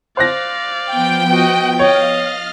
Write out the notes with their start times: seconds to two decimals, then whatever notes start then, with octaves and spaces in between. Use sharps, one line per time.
0.17 C5 D5 F5 F#6 A#6
0.91 F3 B3 G5
1.31 F#4 D#5
1.79 C#5 D#5 F5 F6 A6